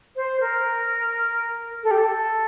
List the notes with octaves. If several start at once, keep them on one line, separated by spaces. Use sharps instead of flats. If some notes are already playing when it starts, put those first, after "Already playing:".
C5
A#4
A4
G4
A4